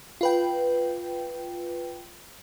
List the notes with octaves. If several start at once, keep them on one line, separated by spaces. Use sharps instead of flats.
F4 B4 G5